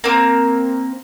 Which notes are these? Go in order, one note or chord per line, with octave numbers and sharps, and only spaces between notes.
A#3 C4